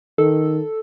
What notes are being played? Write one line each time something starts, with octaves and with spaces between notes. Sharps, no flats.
D#3 A4